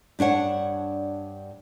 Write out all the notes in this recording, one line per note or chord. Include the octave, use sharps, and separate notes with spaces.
G2 D4 C#5 F#5